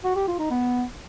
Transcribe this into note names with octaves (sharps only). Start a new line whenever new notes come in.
F#4
G4
F4
D#4
B3